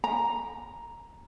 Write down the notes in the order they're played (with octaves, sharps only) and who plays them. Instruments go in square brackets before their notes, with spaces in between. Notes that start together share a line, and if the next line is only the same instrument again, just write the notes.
[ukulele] A#5